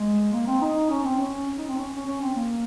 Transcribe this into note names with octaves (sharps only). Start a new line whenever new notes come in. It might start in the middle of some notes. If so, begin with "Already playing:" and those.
Already playing: G#3
A#3
C4
D#4
C#4
C4
C#4
D#4
C4
C#4
C#4
C#4
C4
A#3